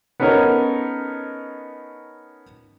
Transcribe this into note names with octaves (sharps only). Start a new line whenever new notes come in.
B3 C#4 D#4 A4 A#4 C#5